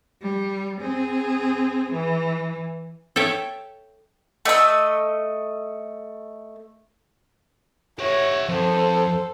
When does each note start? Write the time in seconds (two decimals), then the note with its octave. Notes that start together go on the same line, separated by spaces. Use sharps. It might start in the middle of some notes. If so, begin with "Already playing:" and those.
0.22 G3
0.81 C4 G#4
1.92 E3
3.16 A4 C#5 E5 G5
4.45 A3 D#5 G5 E6
7.99 G4 C#5 E5 F#5
8.49 F2 A4 C5